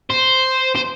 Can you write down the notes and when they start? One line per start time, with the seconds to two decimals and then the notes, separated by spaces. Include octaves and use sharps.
0.10 C5
0.76 C5